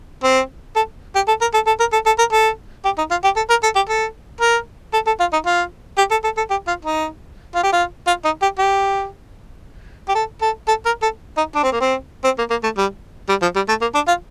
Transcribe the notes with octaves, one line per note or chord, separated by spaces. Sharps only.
C4
A4
G4
A4
A#4
A4
A4
A#4
A4
A4
A#4
A4
G4
D#4
F4
G4
A4
A#4
A4
G4
A4
A#4
A4
A4
F4
D#4
F4
G4
A4
A4
A4
G4
F4
D#4
F4
G4
F4
F4
D#4
G4
G4
G4
A4
A4
A4
A#4
A4
D#4
D4
C4
A#3
C4
C4
A#3
A#3
A3
G3
G3
F3
G3
A3
A#3
D4
F4